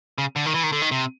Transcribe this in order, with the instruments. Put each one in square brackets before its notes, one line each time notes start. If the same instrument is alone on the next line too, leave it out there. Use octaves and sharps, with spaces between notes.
[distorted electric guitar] C#3
D3
D#3
E3
D#3
D3
D#3
C3